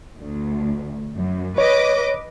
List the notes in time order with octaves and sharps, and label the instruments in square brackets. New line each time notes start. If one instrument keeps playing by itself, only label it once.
[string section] D2
F#2
[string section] B4 D#5 D6 [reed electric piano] C#5